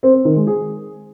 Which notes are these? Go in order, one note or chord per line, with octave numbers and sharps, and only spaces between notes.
C4
C4
D#3
G#3
G#4